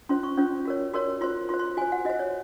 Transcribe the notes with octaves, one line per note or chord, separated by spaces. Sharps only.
C#4 F4 C5 C6
C#6
C#4 F4 C5
F#4 A#4 C#5
F#4 A#4 C#5 C6
F4 C5 C6
F4 C5 C6
C6
F#4 C5 G#5
F#5
F#4 C5 D#5
C#5